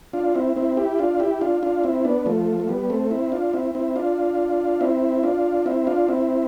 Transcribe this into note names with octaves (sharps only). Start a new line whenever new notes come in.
D4 F4
C4 E4
C4 E4
E4 G4
D4 F4
E4 G4
D4 F4
D4 F4
C4 E4
B3 D4
F3 A3
A3
G3 B3
A3 C4
C4 E4
D4 F4
C4 E4
C4 E4
D4 F4
C4 E4
D4 F4
C4 E4
D4 F4
C4 E4